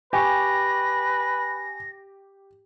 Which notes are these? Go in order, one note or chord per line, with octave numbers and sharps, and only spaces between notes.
G4 B4 G#5 C#6 A#6